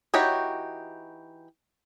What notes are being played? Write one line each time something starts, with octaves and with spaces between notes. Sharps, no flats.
E3 D#4 F#4 G4 C#5